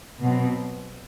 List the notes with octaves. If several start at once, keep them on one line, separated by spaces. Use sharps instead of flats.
B2 F#3 C4